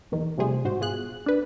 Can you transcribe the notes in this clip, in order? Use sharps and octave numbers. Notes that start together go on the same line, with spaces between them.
B1 E2 D#3
C3 F3 G3 A3 G#4 C5
G#2 F#4 C5
B2 F4 G#4 F#6
D4 B4